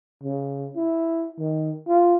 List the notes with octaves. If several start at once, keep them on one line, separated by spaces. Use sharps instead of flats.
C#3
E4
D#3
F4